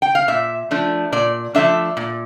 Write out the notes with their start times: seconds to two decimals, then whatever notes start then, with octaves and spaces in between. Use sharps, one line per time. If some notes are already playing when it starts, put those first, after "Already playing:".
0.02 G5
0.15 F5
0.28 A#2 E5
0.71 F3 A3 D4
1.12 A#2 D5
1.55 F3 A3 D4 E5
1.97 A#2